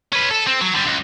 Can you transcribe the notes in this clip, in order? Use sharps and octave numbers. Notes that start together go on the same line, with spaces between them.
C#4 B4
A4
C4
F#3
D3 G3
C#2